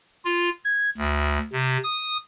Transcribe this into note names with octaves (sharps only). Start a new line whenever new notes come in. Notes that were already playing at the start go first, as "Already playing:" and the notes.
F4
G#6
D2
C3
D#6